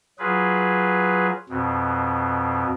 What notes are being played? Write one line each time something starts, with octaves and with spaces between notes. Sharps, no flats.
F#3 F4 G#4 B4
F2 B2